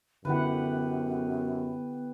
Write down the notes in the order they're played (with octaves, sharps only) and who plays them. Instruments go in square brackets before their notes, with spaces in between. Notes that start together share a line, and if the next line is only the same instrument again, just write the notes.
[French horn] F#2 [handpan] D3 E4 F#5 [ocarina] B3 [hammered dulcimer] G4 B4